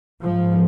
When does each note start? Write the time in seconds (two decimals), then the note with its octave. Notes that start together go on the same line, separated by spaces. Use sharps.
0.22 G#2 F3